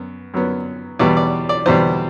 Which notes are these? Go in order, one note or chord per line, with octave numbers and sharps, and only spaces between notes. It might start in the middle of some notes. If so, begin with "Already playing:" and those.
Already playing: F#2 B3
F#2 F#3 B3
E2 B2 G3 D5
D5
D5
E2 B2 G3 C5